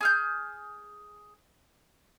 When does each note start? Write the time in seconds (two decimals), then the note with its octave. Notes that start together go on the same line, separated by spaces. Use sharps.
0.01 G#4 F6 G6